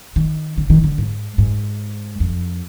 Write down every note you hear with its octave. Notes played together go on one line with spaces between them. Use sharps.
D#3
D3
D#3
D3
G#2
G#2
F2